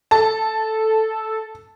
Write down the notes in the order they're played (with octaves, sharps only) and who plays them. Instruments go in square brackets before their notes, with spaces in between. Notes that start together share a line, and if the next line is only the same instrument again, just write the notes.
[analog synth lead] A4 [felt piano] A5